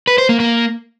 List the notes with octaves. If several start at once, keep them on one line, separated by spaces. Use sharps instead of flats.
B4
C5
A#3
A#3